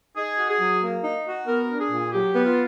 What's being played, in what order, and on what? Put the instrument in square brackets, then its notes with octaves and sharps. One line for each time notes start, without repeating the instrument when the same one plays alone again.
[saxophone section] D#4 [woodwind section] G#4
[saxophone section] F#4
[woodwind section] G#4
[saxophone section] F#3
A#3
D#4
F#4
[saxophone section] B3 [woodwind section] A#4
[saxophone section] D4
[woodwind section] G#4
[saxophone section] A#2
[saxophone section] F#3 [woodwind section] G4
[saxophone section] B3
[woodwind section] F4